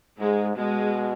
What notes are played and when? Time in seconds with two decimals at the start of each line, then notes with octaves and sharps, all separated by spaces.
0.19 G#2 G#3
0.57 B2 G#3